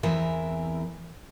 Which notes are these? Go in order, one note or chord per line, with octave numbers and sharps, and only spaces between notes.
E2 E3 C4 A#4 E5